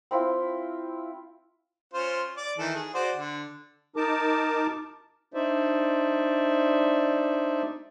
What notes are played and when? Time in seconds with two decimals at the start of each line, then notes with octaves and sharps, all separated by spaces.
0.11 C4 E4 F4
1.94 C#4 F4 C5
2.37 D5
2.58 D#3 E3 A4
2.76 G#4
2.94 F#4 C5 D5
3.16 D3
3.96 D#4 A#4 A5 D6
5.34 D4 D#4 C5 D5 E5